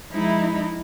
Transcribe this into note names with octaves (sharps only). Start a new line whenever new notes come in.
F3 G#3 D#4 E4